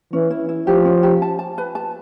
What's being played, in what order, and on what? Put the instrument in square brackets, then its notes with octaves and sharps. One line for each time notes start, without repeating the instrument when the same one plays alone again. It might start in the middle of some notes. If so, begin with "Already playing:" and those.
[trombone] E3 [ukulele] C#4
[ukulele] E4
E4
[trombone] F3 [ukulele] G4
[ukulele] C#4
G4
A5
A5
B4
A5